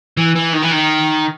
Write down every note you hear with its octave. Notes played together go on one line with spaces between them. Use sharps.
E3
E3
D#3
E3
D#3